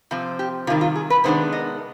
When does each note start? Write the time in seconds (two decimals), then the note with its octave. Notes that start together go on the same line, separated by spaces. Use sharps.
0.11 C3 F3 C4
0.39 G4
0.67 C3 F4
0.70 D#3 G3
0.81 F4
0.96 G#4
1.10 B4
1.24 C3 D#3 G#3 B3 D4 C5
1.52 D#5